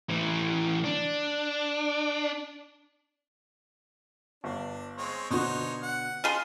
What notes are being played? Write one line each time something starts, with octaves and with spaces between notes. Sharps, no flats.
A2 E3
D4
G1 D4
G#3 C4 C#5
B2 D3 D#4 F#4 C5 C#5
F#5
F4 G#4 C6